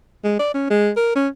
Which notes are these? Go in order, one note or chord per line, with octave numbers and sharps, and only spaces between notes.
G#3
D5
C#4
G#3
A#4
C#4